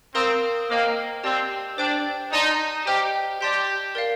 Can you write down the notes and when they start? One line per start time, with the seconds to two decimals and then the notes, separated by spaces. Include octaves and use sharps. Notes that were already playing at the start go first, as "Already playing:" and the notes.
0.15 C4 A#4 F5 A#5 D#6 G6
0.70 A#3 C5 D#5 G5
1.24 C4 G4 D5 A5
1.78 D4 C5 G5 D6 G6
2.33 D#4 D5 A5 C6
2.86 G4 C5 D#5 G5 A#5 F6
3.41 G4 D5 A5 C6 G6
3.95 A#4 D5 F5